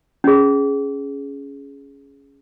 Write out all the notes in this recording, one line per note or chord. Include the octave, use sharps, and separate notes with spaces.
C#4 G#4